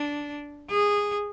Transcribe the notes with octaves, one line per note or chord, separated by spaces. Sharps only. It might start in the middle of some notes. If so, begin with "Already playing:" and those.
Already playing: D4
G#4